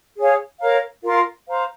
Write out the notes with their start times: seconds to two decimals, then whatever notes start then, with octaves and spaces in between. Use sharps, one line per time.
0.18 G#4 C#5 F5
0.61 A#4 C#5 F5 A#5
1.04 F4 A#4 F5 C6
1.48 C5 F5 A#5